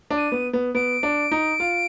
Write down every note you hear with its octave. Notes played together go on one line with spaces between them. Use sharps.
D4
D#7
B3
B3
B3 D7
D4
D#4
F4